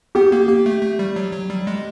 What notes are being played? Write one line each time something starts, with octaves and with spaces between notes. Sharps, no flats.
B3 G4
A#3
A#3
A3
A3
G3
F#3
F#3
G3
G#3